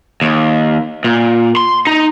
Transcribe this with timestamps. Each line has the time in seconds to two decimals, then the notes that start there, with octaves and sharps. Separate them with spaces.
0.21 D#2
1.04 A#2
1.57 C6
1.87 D#4